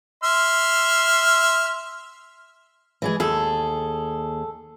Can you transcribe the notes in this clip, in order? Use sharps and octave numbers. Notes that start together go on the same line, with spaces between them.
E5 C6 F6
E3 G#3 G#4
D#2 G#4 A4